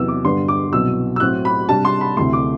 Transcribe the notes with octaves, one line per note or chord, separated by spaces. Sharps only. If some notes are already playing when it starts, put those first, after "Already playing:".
Already playing: E2 C3 F#3 B3 E6
D6
G2 D3 G3 B3 D4 C6
D6
C2 B2 F#3 E6
E6
A2 F#3 C4 F#6
B5
C3 G3 D4 A5
C6
B5
D2 C3 E3 A3 C6
D6